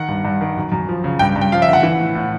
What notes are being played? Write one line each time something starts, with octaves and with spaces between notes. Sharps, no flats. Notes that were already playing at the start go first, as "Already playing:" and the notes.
Already playing: D#3 F#5
G2
G2
D#3
F#2
F#2
F3
C#3
G2 G5
G2
G5
F3 F5
E5
D3
F#5
E3
A2
A2